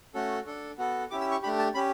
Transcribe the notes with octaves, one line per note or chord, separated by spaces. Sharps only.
A3 C#4 F#4 A4
D4 A4
B3 F#4 A4
C#4 E4 G4 D6
E6
C#6
A3 D4 G4 B5
A5
C#4 G4 B5